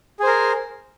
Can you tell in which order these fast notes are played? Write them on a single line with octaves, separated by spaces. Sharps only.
G#4 C5 A#4